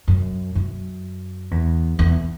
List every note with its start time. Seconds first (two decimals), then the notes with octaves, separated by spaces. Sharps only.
0.08 F#2
0.55 F#2
1.51 E2
1.99 E2